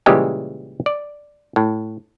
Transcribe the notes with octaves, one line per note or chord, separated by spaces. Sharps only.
A#2 C#3 E3 G3 G#3 G4
D5
A2